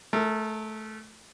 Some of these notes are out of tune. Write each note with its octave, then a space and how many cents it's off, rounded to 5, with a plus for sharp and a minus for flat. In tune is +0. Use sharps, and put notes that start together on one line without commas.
A3 -20 A#4 -40